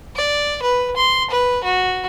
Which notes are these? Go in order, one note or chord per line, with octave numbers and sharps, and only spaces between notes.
D5
B4
C6
B4
F#4